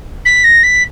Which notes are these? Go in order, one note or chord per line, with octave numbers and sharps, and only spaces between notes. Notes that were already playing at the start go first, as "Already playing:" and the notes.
B6
A#6
B6